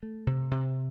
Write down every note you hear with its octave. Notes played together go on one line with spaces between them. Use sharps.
A3
C3
C3